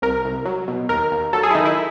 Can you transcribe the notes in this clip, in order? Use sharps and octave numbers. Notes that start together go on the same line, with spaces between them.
C2 A#4
C2
F#3
B2
D#2 A#4
D#2
F#3 A4
G#4
E4
D#3 D#4
E4